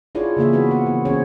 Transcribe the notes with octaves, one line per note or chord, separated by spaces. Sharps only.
D4 E4 F4 G#4 C#5 D5
C#3 E3 A#3 G#4 E5
B3 E4 F#4 B4
C4 F#5
E3
C4 C#4 G#4 C#5